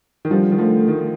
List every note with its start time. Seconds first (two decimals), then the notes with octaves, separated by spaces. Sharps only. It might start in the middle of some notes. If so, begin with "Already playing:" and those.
0.25 D#3
0.30 D3 F3 G3
0.51 D#3
0.58 D3 F3 A3
0.88 D#3